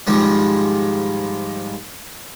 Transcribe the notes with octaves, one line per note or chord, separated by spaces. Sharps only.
G#2 D#3 F3 G3 G#3